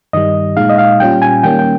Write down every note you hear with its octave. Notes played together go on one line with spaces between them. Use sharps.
G2 D#3 G3 D#5
A#2 G#3 D#4 F5
D#5
F5
A#2 G3 C#4 F4 G5
G#5
D#3 G3 A#3 C#4 G5
G5